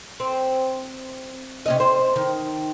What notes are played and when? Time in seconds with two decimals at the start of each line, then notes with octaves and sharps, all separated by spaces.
0.20 C4
1.66 C3 C#4 D#5
1.80 C5
2.16 D#3